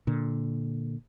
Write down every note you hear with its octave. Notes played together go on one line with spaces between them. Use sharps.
A#2 D3